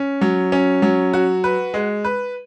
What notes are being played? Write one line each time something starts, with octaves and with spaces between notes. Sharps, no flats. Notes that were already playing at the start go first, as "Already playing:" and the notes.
Already playing: C#4
F#3
C#4
F#3
F#4
B4
G#3
B4